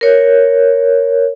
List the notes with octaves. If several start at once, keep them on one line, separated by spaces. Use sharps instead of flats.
A#4 C#5